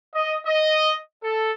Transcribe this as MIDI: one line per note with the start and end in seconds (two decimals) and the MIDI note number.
0.14 0.37 75
0.46 0.95 75
1.22 1.52 69